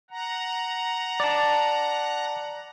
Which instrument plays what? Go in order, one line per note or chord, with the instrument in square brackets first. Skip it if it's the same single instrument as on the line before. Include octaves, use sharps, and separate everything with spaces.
[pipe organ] F#5 A#5
[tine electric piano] D5 A5